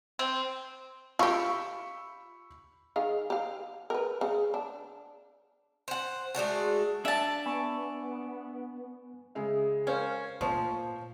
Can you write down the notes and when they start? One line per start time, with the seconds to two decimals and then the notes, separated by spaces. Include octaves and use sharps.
0.19 C4
1.19 F4 G4 B5 C#6 E6
2.96 D#3 G#4 F5
3.30 G4 F5
3.90 A#4 B4
4.21 C#3
4.54 D4
5.88 C5 F#5
6.35 G#3 A3 D4 F#4
7.05 D4 E5 A5
7.46 B3 G#5 B5 C#6
9.35 C#3 G#3 E5
9.87 C#4 A#4 C5 F5
10.41 A#2 F3 C5 C#6